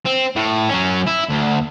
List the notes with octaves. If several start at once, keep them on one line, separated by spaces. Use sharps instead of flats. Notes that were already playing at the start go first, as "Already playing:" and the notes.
C4
A2
F#3 C#4
E4
D2